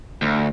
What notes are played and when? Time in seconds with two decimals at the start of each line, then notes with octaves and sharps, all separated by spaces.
0.22 D2